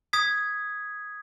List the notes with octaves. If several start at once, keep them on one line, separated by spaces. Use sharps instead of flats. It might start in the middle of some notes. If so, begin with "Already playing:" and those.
D#6 G#6 B6